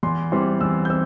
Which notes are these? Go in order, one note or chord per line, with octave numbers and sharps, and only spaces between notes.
E2 C6
E3 G3 C4 C6
E2 E6
G6
C4 E6